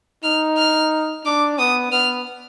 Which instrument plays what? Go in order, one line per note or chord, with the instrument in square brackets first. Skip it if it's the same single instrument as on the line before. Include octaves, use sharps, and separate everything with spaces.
[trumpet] D#4 [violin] F6
[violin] F6
[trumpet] D4 [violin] D6
[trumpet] B3 [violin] D#6
[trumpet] B3 [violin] F6